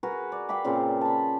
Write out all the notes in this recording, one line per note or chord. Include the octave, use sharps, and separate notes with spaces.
F#4 G#4 A#4 B4
B4 D5
G4 F5 B5 D6
A#2 C#3 C4 D5
A5 B5